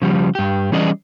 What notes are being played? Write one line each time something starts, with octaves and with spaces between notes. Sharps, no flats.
C#3 F3 G3
G2 G4
E3 G3 C#4 G#4 D5 D#5